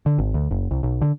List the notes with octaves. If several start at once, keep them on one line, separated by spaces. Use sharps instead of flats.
D3
G#1
D2
F#1
C2
B1
D3